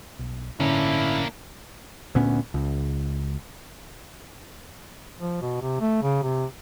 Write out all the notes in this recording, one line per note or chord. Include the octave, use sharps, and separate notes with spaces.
B1
G1 A2 D3 A#3 C#4 D4 E4
D2 A#2 B3 C#4
C#2
F3
B2
C3
A3
C#3
C3